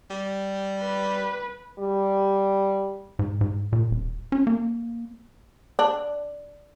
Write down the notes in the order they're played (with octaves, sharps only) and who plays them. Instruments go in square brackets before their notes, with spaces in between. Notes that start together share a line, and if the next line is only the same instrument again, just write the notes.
[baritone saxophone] G3
[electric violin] B4
[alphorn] G3
[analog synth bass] G#2
G#2
A#2
D#1
C#4
A#3
[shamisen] D4